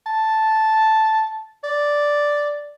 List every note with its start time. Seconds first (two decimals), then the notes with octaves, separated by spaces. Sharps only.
0.06 A5
1.64 D5